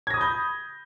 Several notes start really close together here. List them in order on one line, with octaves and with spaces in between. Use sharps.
G#6 A#6 D#6 B5 G6